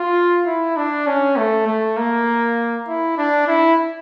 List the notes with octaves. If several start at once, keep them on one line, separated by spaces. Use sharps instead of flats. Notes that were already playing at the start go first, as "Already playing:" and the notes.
Already playing: F4
E4
D4
C#4
A3
A3
A#3
E4
D4
E4